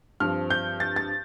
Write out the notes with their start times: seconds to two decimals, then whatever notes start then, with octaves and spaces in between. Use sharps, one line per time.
0.20 G2 F3 C4 F6
0.50 G6
0.80 A6
0.96 A6